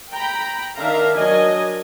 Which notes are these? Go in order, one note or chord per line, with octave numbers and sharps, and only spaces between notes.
G5 A#5 B5
D#3 D4 E5 F5 A#5
F#3 D4 A#4 D#5 G#5